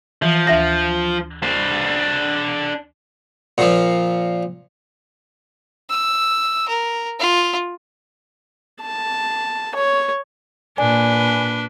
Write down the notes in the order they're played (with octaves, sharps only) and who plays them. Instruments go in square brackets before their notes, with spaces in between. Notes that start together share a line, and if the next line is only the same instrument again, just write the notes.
[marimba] E3 [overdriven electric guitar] F3
[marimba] D2 E5 A#6 [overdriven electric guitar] F3
[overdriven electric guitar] D4 C5
[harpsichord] A#2 F3
[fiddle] E6
A#4
F4
[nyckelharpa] A5
C#5
[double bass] A#2 [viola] D4 B4 [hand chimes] D5 G#5